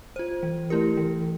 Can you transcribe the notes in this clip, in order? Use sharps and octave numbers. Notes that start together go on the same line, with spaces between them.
F4 C5
E3
A3 E4 G4 A#4
E3